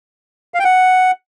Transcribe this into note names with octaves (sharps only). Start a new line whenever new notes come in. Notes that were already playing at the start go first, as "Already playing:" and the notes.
F5
G5
F#5